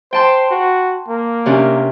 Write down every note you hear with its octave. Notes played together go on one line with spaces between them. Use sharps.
C5 G5 A5 C6
F#4
A#3
C3 C#4 D4